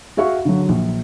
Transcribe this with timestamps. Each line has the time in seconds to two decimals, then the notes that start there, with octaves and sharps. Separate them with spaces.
0.17 F#4 G#4 E5 F5 C#6
0.45 D3 F#3
0.69 A#1